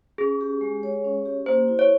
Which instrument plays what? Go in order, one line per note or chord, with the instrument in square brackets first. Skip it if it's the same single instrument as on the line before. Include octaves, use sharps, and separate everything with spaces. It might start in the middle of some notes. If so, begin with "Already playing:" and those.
[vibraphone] C#4 [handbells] G#4
[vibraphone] G4
G#3
C#5
C#4
G4
[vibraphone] A#3 [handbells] C5
[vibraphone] E4
[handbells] C#5